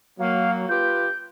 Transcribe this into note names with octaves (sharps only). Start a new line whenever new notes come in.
F#3 A#3 F5
F4 G4 B4 G6